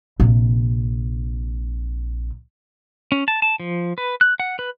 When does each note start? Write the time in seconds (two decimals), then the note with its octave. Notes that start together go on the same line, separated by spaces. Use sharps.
0.20 A#1 C3
3.12 C#4
3.28 A5
3.42 A5
3.60 F3
3.98 B4
4.21 F#6
4.40 F#5
4.59 B4